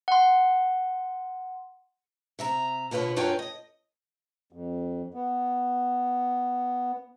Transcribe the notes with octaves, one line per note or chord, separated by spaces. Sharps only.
F#5 C6
C3 E5 A#5
B2 D3 F4 B4 C#5
F#2 D4 F4 B4 C#5 G5
D#5
F2
B3